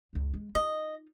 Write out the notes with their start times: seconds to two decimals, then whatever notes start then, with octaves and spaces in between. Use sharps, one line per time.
0.13 C#2 F#2
0.34 G#3
0.55 D#4 F4 D#5